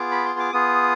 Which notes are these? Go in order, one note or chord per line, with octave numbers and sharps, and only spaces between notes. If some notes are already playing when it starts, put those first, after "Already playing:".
Already playing: B3 F4 G#4 D6
B5
C6
D6
B3 F4 G#4 D#6